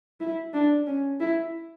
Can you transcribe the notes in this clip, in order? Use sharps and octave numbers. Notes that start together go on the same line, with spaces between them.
E4
D4
C#4
E4